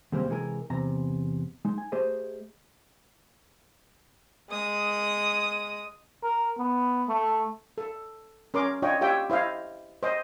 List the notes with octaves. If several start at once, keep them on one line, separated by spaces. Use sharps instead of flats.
D#2 C3 G3 G#3 A#3 C4
C3 E3 G#3 F#4 G#4 A#4
E2 C3 A#5
G#3 D#4
G#5
A3 G4 G#4 C5 D#5
G#3 D#6
A#4
B3
A3
A4
C#4 A#4 C6 D6
D4 F4 C#5 D#5 G5
F4 G4 C#5 E5 G5
E4 C5 D#5 F5
C5 D#5